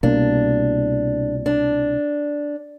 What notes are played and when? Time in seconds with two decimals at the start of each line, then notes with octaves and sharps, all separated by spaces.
0.03 C2 B2 A#3 D4
1.46 D4